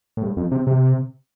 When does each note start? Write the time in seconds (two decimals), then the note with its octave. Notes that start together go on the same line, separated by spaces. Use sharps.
0.17 A2
0.23 G2
0.37 F2
0.51 C3
0.67 C3